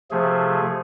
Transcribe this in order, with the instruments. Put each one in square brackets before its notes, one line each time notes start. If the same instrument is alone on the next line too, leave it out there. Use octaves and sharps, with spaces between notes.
[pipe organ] C3 F3 A3 G#4